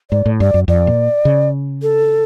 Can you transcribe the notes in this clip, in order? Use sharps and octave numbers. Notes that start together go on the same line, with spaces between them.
G#2 D5
A2
G2 D5
F#2
F2 D5
A#2
C#3
A4